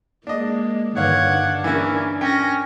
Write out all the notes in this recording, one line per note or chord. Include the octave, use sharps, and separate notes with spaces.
G#3 A#3 D4 D#5
G2 D3 D#3 C#5 F5 F#5 G#6
D4
E3 A#3 C#4 E4
C#4 G5 A#6